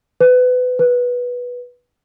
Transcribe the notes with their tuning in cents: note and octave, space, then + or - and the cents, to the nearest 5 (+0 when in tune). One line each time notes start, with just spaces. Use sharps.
B4 +25
B4 -10